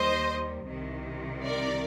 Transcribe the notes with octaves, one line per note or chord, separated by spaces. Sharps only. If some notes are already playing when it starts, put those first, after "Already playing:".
Already playing: D#2 D#3 G3 C5 D#5
C2 C3 D#3
A#4 D5